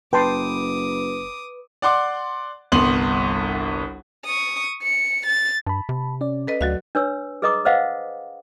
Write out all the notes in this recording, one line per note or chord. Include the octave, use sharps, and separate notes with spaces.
F#1 B4 G5 A5 C6 D6 D#6
D5 F#5 C6 D6
G1 C2 B3 C6 F#7
C#6 D#6
C#7
A6
G2 A5 B5
C3
C#4 D5
A4 B4 D#5
D2 F#3 F#4 F5
D4 B4 C#5 E6
G#4 B4 D#5 A#5 D6 D#6
B4 C5 D#5 F5 F#5